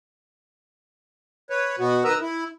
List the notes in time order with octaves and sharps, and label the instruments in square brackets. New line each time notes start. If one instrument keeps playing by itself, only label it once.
[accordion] B4 C#5
B2 B3 F#4
D#3 A#4 B4 D#5 A#5 E6
E4